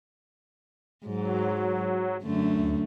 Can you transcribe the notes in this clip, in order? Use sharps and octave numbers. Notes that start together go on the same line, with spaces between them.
G#2 F#3
F#2 D3 A3
D2